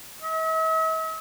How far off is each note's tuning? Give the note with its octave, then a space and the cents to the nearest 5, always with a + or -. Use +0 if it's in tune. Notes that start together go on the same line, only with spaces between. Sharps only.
E5 -45